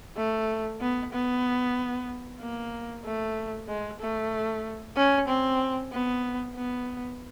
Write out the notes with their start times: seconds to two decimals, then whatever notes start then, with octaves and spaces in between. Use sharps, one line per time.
0.17 A3
0.81 B3
1.13 B3
2.41 A#3
3.05 A3
3.68 G#3
4.00 A3
4.96 C#4
5.28 C4
5.92 B3
6.56 B3